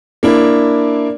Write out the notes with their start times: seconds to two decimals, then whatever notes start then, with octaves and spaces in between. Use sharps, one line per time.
0.23 A#3 D4 E4